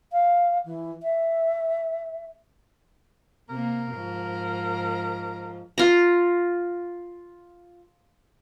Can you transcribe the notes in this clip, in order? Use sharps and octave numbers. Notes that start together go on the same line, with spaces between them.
F5
E3
E5
C3 A#3 A#4
G#2 F3
F4 A#5